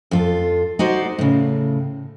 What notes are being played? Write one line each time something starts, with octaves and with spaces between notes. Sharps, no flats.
F2 F4 A4
D#4 F#4 C5 D5
A2 C#3